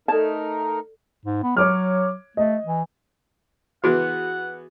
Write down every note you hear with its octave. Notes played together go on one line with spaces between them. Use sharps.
A3 D#4 A4 A#4 D5 A5
G#2
B3
F#3 C#5 D6 F6
A3 D#5
E3
E3 B3 F#4 G#4 F#5